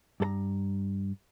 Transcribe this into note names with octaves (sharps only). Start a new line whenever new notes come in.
G2 A4 A#5